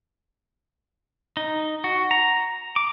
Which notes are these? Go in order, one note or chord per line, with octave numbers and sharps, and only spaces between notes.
D#4
F#4
A#5
D6